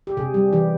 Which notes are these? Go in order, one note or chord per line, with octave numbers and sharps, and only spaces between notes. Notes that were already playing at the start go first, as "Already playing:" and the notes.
G4
C3 G#4
G3
E3 G4